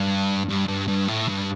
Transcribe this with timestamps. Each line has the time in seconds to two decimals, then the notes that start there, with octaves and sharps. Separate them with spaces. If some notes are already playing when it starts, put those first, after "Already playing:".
Already playing: G2
0.49 G2
0.68 G2
0.88 G2
1.08 A2
1.28 G2